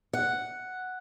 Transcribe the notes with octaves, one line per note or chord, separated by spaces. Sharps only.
F#5